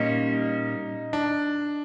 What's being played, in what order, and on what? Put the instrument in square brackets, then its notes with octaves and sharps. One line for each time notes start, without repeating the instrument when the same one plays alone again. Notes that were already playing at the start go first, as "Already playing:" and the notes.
Already playing: [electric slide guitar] A#2 G3 A#3 C#4 [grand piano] D#4
[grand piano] D4